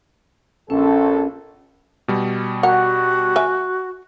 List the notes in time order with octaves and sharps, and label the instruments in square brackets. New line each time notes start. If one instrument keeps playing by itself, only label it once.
[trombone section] A#1 A4 [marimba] C#4
[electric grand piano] B2 G3
[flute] F#4 [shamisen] A#4 F#5
[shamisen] A#4 E5 G#5